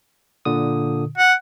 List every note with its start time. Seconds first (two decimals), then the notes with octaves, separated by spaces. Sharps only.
0.45 A#2 D3 D#6
1.18 F#5